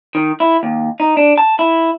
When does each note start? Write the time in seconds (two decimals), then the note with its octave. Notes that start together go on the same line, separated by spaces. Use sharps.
0.15 D#3
0.40 E4
0.63 D#2
1.00 D#4
1.17 D4
1.38 A5
1.59 E4